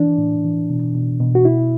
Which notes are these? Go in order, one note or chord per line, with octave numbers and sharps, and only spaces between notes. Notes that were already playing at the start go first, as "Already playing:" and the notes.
Already playing: E3 D4
A2
E3
B2
B2
B2
F#4
B2 E4